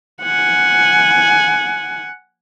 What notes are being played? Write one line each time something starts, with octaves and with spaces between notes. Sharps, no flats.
F#5 G#5